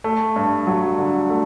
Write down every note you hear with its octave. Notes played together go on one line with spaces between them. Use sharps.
A3
G2
F#3
D3
A3